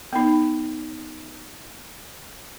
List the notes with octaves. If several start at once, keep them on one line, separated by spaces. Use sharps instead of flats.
B3 D#4